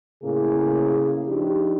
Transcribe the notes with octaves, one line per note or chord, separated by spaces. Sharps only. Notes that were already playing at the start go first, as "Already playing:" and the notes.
A2 C#3 A#3 E4 G#4
F3 D4 D#4 G4